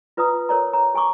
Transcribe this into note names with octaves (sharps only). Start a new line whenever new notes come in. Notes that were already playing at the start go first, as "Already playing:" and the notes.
F4 B4 D5 A#5 D#6
A#4 C#5 D5 A#5
C#5 A#5
G4 G#5 A#5 C#6 D6